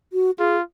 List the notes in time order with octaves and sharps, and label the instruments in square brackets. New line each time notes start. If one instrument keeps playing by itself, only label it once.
[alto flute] F#4
[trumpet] F4 [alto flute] G#4